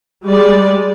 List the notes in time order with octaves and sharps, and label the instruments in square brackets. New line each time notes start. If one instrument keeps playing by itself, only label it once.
[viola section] G3 G#3 D5